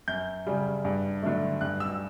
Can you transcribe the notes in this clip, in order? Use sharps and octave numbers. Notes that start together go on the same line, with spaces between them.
F#2 G6
C#3 G3
G2
D3 F#3 A3
G2 F#6
E6